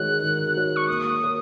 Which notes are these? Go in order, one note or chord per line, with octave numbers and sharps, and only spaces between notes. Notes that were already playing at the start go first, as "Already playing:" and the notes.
Already playing: D#3 G#3 F#4 C#5 F#6
D#3
G#3 F#4 C#5
C#6
A#3 D#6
F#4 A#4 C#5